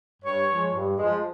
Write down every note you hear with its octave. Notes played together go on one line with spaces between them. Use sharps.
G2 C#5
F3 G#3
G2
F3 G#3